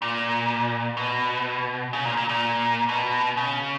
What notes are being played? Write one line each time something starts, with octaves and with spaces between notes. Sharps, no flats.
A#2
B2
C#3
A#2
A#2
A#2
B2
C#3